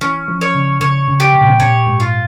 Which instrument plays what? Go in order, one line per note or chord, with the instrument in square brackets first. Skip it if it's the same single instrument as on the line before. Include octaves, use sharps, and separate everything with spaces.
[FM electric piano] E3 [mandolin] C#4
[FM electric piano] F3
[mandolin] C#5
[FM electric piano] C#3
[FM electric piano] C#3 [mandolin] C#5
[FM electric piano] C#3
[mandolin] G4
[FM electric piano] C3
A#2
C3
[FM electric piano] A#2 [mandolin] C#5
[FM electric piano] G#2
[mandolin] F4